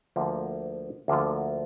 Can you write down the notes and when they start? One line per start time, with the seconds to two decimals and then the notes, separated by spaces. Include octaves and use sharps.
0.16 D2 D3 F3 A#3 F4
1.08 D2 D3 F3 A#3 F4